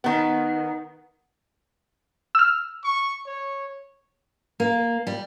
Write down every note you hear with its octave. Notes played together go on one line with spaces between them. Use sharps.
D#3 B3
E6 F6
C#6
C#5
A#3
G3